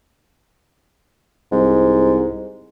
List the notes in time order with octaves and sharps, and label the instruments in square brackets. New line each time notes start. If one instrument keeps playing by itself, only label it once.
[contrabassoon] C2 [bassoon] G#2